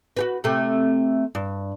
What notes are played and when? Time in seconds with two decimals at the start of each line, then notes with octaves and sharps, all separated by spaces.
0.16 F#4 G4 B4
0.44 C3 A3
1.35 G2